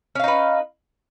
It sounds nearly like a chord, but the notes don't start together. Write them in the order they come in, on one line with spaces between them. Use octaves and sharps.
C#4 F5 D#4 B4